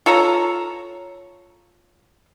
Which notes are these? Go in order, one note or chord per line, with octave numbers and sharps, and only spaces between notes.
F4 A4 C#5 A#5